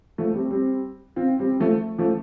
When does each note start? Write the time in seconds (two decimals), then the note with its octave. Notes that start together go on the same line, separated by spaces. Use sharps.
0.18 F3 A3
0.34 G3 C4
0.51 G3 C4
1.16 C4 F4
1.39 G3 C4
1.60 F3 A3
1.98 F3 A3